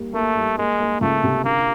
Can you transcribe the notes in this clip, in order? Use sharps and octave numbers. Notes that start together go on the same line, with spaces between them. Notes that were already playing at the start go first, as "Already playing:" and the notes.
Already playing: G3 A#3
A3 A#3
G3
G#3 A#3
A#3
C#2 A3
C3
D3 A#3